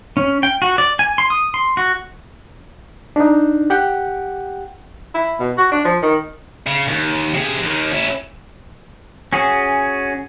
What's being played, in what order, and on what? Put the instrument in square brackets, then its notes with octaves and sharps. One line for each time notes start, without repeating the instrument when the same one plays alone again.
[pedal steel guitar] C#4
G5
F#4
D5
G#5
C6
D#6
C6
F#4
[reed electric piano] D4 D#4
G4 F#5 G5
[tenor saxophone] E4
B2
F#4
D4
F3
D#3
[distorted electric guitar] C#3
D#2
C3 G#4
D#2 D#3
C#4 E4
[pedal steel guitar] C#4 F#4 G#4